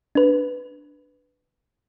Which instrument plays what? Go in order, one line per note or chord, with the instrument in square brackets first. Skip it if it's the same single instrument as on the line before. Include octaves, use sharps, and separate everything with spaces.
[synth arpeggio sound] D4 B4